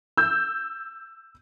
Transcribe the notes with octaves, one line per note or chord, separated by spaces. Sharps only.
E6 G6